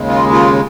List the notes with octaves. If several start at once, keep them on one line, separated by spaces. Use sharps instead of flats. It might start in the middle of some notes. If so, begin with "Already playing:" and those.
Already playing: D#2 C#3 G#3
F4
F4